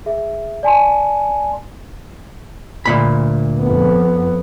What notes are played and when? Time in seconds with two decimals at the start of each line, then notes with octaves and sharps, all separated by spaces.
0.06 G#4 E5
0.63 D5 G#5 A5 C6
2.86 D2 A#2 B5
3.61 F2 B3